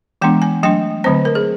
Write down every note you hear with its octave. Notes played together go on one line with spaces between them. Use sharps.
E3 G#3 B3 D4 G5
G#5
F#3 A3 D4 G5
D3 F#3 A3 C4 C5
A#4
G#4